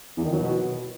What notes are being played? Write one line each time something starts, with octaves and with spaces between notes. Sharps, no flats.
E2
D#3
F#3
B2